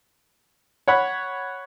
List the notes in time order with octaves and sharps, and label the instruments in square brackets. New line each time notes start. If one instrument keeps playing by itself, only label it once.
[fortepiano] C#5 F#5 B5